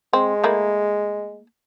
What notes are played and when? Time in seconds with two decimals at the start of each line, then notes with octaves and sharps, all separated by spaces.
0.13 G#3 C4
0.44 A3 A#3 E4